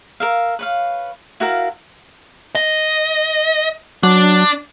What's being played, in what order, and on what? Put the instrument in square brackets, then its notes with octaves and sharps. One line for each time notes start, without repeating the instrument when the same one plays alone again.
[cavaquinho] A#4 E5 F5
B4 C#5 F5
E4 F#4 A#4 F5
[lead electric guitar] D#5
[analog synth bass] F#3 [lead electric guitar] D4